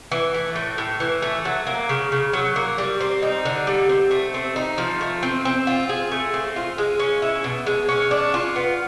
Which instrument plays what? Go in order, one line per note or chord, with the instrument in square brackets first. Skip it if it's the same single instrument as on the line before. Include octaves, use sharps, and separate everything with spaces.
[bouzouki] E3
A3
A2
A2
E3
A3
F#3
A#3
C#3
C#3
F#3
A#3
G3
C4
D#4
D3
G3
C4
A3
C4
D#4
F3
A3
C4
C4
F4
G#4
A3
C4
F4
G#3
C#4
E4
B2
G#3
C#4
D4
F4
B3